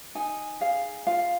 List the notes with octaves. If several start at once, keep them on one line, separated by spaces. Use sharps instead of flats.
D#4 G#5
G#4 F5
F4 F5